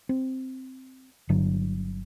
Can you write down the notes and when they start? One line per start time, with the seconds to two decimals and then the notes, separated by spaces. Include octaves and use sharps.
0.09 C4
1.29 G1 G2 D3 F#3